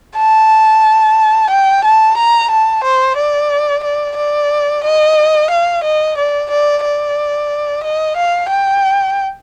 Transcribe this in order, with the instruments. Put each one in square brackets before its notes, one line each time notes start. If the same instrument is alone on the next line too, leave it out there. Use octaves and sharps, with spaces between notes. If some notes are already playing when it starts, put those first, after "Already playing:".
[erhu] A5
G5
A5
A#5
A5
C5
D5
D5
D5
D#5
F5
D#5
D5
D5
D5
D#5
F5
G5